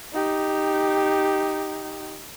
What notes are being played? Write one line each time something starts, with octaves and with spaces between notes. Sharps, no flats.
D#4 G4